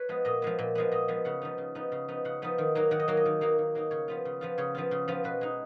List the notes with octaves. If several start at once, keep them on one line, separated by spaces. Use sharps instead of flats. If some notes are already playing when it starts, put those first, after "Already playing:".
Already playing: B4 C#5
F3 G#3 B3
A#2 D#5
F3 G#3 B3
A#2
F3 G#3 B3
A#2 D#5
F3 G#3 B3
C#3 F#5
F3 B3 D#4
C#3
F3 B3 D#4
C#3
F3 B3 D#4
C#3 F#5
F3 B3 D#4
D#3
F#3 A#3 D#4
D#3 F#5
D#5
F#3 A#3 D#4 C#5
D#5
D#3
F#3 A#3 D#4
D#3
F#3 A#3 D#4
C#3 C#5
F3 B3 F4
C#3
F3 B3 F4
C#3 C#5
F3 B3 F4
C#3
F3 B3 F4
B2 B4
G#3 D#4